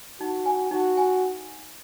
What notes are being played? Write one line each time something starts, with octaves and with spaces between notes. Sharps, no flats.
D#4 F#4
G#5
D#4 F#4
G#5